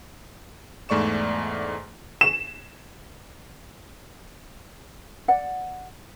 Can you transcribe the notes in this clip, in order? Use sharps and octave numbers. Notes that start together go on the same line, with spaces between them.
E2 G#2 A3 D5 C#6 E7
E7
D5 F#5